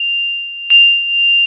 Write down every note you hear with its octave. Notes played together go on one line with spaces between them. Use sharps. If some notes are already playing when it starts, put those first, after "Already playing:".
Already playing: F7
F7